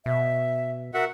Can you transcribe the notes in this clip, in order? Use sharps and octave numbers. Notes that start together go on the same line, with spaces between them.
B2 E5
F#4 A#4 E5 F#5